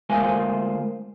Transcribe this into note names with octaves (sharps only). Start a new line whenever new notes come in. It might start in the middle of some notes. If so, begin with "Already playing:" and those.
D2 G#3 A#3 F4 C5 G#5